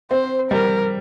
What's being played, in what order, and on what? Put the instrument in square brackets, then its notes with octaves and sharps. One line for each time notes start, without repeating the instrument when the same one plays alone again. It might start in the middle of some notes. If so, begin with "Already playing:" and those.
[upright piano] C4 [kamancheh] C5
[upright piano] G3 [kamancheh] A#4